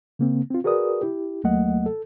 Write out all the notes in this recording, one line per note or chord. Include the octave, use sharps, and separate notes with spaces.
C#3 A#3 C4
C4 F4
F#4 G#4 A#4 B4 D5 D#6
E4 G4
D#2 F#3 A3 A#3 D#5 F#5
A4